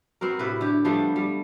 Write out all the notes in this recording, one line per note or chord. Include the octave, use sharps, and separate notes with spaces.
B3 C4 F#4 A#4
A2 C3 B4
D3 G4
F3 G3 A3 B3
G3